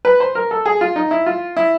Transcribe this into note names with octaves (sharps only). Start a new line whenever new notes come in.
B4
C5
A#4
A4
G#4
F4
D#4
E4
F4
E4